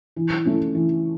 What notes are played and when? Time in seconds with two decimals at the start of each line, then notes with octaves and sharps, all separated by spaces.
0.16 E3
0.45 A3 C#4
0.75 E3